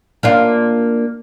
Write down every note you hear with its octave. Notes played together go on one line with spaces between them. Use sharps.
A#3 D4 F4